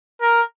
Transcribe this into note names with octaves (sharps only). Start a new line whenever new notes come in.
A#4